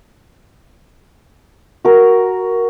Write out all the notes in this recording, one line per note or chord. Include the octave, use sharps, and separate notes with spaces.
F#4 A#4